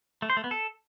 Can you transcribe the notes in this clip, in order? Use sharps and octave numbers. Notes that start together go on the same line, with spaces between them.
A3
C5
A3
B3
A4